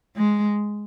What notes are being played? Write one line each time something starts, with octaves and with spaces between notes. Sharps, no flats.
G#3